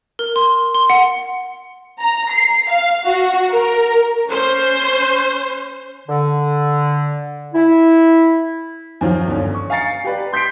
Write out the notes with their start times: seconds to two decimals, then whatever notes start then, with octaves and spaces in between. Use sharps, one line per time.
0.19 A#4
0.36 C6
0.75 C6
0.90 F#5
2.01 A#5
2.32 C7
2.70 F5
3.05 F#4
3.52 A#4
4.29 C#4 C5
6.08 D3
7.54 E4
9.01 F#2 D#3 F3 F#3 F4
9.27 G1 C#4
9.55 C#6
9.70 F5 G#5 A#5 A6 C7 C#7
10.04 G4 B4 D5
10.32 C6 G6 B6 C7 D7